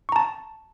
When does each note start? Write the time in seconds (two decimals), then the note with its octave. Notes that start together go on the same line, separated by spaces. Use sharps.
0.09 C#6
0.12 A#5
0.16 A5